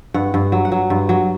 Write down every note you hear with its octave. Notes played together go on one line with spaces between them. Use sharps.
G2 F#5
G2
F#3
F#5
F#3
G2
F#3